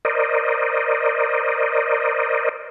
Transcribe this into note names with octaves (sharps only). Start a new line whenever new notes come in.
A#4 C5 D5 D#5